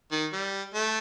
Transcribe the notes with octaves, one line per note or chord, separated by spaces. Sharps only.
D#3
G3
A3